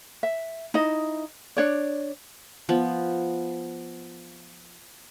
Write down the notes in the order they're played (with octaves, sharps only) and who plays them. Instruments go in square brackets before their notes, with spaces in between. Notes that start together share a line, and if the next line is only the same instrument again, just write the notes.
[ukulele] E5
D#4 E4 D#5
D4 C#5 D5
[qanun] F3 B3